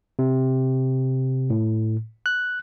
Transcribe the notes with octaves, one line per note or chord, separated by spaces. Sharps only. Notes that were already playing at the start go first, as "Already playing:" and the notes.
C3
A2
F#6